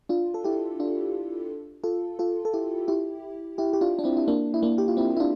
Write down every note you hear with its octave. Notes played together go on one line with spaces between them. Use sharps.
D4 F4
A4
E4 G4
D4 F4
F4 A4
F4 A4
A4
E4 G4
E4 G4
E4 G4
G4
D4 F4
D4
C4 E4
E4
A#3 D4
E4
A#3 D4
G4
F4
C4 E4
E4
D4 F4